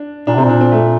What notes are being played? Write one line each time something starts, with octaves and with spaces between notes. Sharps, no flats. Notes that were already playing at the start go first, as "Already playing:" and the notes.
Already playing: D4
A#2 D4
C3 C4
A#2
D4
C4
A3